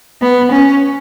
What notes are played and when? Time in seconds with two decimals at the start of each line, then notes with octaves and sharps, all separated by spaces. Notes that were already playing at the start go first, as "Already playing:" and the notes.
0.21 B3
0.51 C#4